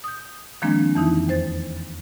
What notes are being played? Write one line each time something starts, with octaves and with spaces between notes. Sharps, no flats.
D#6 G6
D#3 F3 G#3 A#3 C4 D4
F2 E3 D#4 E4
E2 C5 A6